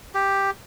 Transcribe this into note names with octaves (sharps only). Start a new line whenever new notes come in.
G4